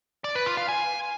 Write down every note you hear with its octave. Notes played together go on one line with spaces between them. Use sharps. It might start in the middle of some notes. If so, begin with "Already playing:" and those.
D5
B4
F4
F5
G#5